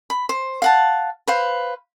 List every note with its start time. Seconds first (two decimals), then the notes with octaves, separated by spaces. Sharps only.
0.10 B5
0.29 C5
0.62 F5 F#5 A5
1.27 B4 C5 F5